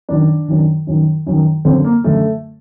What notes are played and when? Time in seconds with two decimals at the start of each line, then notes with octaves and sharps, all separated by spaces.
0.09 F#2 D#3 D4
0.48 F#2 D#3
0.87 F#2 D#3
1.26 F#2 D#3
1.65 F#2 D3 C4
1.84 A#3
2.04 F#2 D3 A3